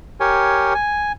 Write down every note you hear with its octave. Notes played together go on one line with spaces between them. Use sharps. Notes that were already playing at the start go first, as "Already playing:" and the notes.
G4 A#4 C#5 G#5
G#5